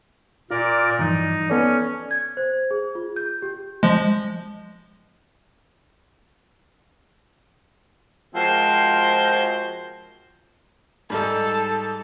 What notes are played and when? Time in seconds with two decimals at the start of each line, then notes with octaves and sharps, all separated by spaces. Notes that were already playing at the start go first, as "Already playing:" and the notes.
0.51 A#2 F4 A#4 D5
0.99 G2 E3 F3 D#4
1.50 B3 C#4 A4 D5
2.11 G#6
2.37 C5
2.71 G#4
2.95 F4
3.16 G6
3.42 G4
3.83 F3 G#3
8.35 F3 G#3 C4 F#4 A#4 C5
11.10 G#2 G3 D#4 A4